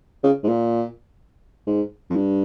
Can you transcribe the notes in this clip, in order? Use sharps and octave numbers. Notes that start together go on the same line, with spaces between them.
C#3
G#2
A#2
G#2
F2
G2